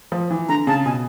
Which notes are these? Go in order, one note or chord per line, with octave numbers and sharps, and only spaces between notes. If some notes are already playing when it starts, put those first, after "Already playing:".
F3
E3
D3 A#5
C#3 A5
B2 G#5